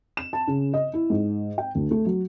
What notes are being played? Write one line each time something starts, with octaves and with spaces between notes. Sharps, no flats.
E7
A5
C#3
D#5
E4
G#2
G5
D2
A3
F#3